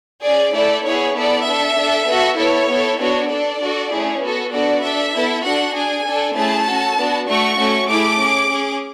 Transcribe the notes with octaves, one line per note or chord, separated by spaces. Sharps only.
C#4 G#4 D5
A3 E4 A4 D5
B3 E4 G#4 C#5
B3 E4 A4 D5
D4 A4 E5
D4 A4
B3 F#4 A4
B3 E4 A4 C#5
B3 E4 A4
B3 D4 F#4 C#5
D4 A4 D5
D4 F#4 A4
A3 C#4 E4 G#4
B3 F#4 A4
B3 D4 F#4 A4 D5
D4 A4 E5
B3 E4 A4
D4 F#4 A4 F#5
D4 G#4 G#5
D4 A4
A3 C#4 E4 G#4 A5
C#4 F#4 A4
B3 D4 F#4
A3 D4 F#4 C#6
A3 C#4 F#4
A3 E4 G#4 D6
C#4 G#4
C#4 G#4